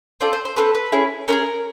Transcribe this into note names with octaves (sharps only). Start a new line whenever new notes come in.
C4 F4 A4 D5
C5
C5
C4 F4 A4 B4
B4
C#4 E4 G#4
C#4 E4 G#4 A#4